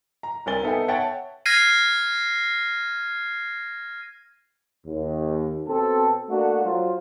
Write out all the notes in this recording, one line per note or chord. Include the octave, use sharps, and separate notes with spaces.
A#5
C2 C4 A#4 G#5 A6 G7
B3 D#4 A4 E5 G5 G#5
C#5 E5 F#5 G5 A5 A6
F6 G#6 A#6 C7 D#7
D#2
B2 C4 A4
A3 A#3 D4 F#4
F#3 F4 C5